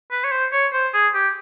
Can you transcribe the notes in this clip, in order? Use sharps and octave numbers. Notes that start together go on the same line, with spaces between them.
B4
C#5
C5
C#5
C5
G#4
G4